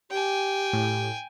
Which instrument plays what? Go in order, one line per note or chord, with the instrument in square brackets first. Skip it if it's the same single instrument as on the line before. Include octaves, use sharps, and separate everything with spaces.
[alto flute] G4 [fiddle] G5 G#5
[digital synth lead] A2